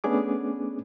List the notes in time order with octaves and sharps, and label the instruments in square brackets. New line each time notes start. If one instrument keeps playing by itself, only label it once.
[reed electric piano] A3 B3 C#4 D4 G#4 D6